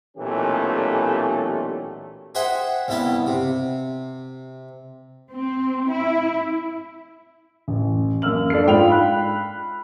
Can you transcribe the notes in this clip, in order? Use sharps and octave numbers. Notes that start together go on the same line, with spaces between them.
B1 A#2 E3 A3 C#4 G4
G#4 C5 E5 F#5 G5
C2 G2 B3 E4 G5 A5
C3
C4
E4
A1
F#2 A#3 E6 F6 F#7
D4 A4 C7
G#2 G#3 F4 G5 B5 F7
B5 F#6